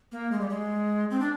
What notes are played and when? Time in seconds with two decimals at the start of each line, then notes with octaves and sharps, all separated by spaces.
0.12 A#3
0.32 G#3
0.40 G3
0.49 G#3
1.10 C4
1.20 D4